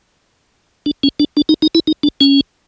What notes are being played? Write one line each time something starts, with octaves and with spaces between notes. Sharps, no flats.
D4
C#4
D4
D4
D#4
D#4
E4
D#4
D4
C#4